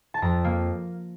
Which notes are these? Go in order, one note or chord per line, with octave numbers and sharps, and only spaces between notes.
A5
F2 A#5
A#3